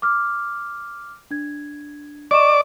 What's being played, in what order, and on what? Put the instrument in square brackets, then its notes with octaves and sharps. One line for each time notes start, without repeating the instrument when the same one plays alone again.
[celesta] D6 F6
D4 G#6
[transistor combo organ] D5 D6 [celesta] D#5 C#6 E7